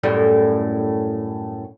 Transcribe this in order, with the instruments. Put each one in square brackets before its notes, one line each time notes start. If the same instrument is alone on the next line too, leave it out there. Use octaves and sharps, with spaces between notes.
[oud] F#2 A2 G3